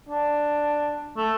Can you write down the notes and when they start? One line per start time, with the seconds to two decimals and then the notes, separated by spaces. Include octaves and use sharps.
0.09 D4
1.17 A3